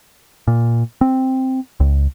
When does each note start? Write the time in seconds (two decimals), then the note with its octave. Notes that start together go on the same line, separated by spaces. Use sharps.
0.48 A#2
1.01 C4
1.80 C#2